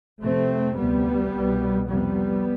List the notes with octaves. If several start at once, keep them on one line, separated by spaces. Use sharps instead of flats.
F2 C3 A3 C4
D2 C3 G3 B3
C2 B2
F2 C3 G3 B3